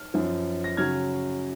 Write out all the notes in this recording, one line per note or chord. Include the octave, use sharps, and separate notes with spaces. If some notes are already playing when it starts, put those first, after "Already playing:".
Already playing: F6
F#2 F3
A#6
C#3 F#3 F6 G#6